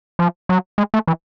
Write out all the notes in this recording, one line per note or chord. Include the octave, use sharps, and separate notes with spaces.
F3
F#3
G#3
A3
E3